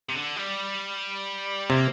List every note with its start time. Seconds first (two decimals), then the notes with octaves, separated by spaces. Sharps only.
0.09 C3
0.15 D3
0.37 G3
1.70 C3 A#3